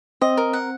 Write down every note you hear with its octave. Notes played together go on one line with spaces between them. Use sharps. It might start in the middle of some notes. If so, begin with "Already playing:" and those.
C4 D#5
A#4
F#5